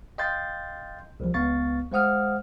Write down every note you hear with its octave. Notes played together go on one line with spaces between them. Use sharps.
D#5 F5 G5 C6 G6 A6
C2 F3
C#2 B3 F5 C#6 A6
G#3 C5 F5 F#5 D#6 F6